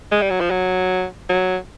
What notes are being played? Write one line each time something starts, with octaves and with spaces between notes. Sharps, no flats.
G#3
G3
F#3
F3
F#3
F#3